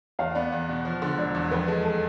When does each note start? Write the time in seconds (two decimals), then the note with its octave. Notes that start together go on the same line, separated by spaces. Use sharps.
0.19 E2 F5
0.35 B3 D5
0.52 E2
0.69 B2
0.85 F3
1.02 D3
1.18 E1 D5
1.35 E2
1.51 F2 B4
1.68 G#3 A4
1.84 A4